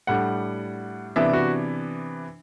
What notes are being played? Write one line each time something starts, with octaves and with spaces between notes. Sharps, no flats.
A2 G3 D4 F#5
C3 E3 B3 D4 E5
F#4